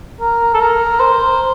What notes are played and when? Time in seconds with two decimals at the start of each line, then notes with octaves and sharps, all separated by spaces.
0.20 A#4
0.54 A4
0.60 A#4
1.00 C5